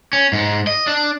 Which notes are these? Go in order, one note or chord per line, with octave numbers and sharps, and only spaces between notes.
C#4
G#2
D#5
D4